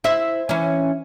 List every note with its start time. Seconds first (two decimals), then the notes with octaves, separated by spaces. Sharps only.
0.04 E4 C5 E5
0.49 E3 C#4